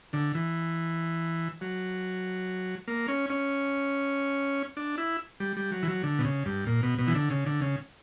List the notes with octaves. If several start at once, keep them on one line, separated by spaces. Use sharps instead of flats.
D3
E3
F#3
A#3
C#4
C#4
D4
E4
G3
G3
F#3
E3
F#3
D3
B2
C#3
G2
A#2
B2
B2
E3
D3
C#3
D3
C#3